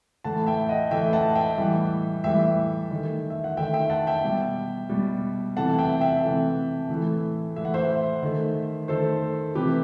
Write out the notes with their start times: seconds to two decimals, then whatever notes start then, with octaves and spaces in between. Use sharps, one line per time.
0.24 A2 E3 A3 F#5 A5
0.46 E5 G5
0.69 D#5 F#5
0.91 A2 E3 A3 E5 G5
1.13 F#5 A5
1.35 E5 G5
1.58 A2 E3 G3
2.24 A2 E3 G3 E5 G5
2.91 D#3 A3
3.30 E5
3.44 F#5
3.57 D#3 A3 E5 G5
3.74 E5 G5
3.90 F#5 A5
4.07 E5 G5
4.24 B2 G3
4.89 B2 G3
5.57 C3 E3 A3 F#5 A5
5.79 E5 G5
6.01 E5 G5
6.23 C3 E3 A3
6.89 A2 E3 A3
7.56 A2 E3 A3 E5
7.65 F#5
7.74 C5 E5
8.23 D#3 A3
8.88 D#3 A3 A4 C5
9.55 C3 E3 A3 G4 B4